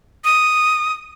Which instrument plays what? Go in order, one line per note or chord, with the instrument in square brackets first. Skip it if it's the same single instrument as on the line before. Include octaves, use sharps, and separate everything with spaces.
[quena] D#6